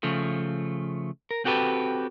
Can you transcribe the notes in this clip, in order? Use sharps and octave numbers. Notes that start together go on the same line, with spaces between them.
C#3 F3 A3
A#4
C4 F#4 G4 A4 B4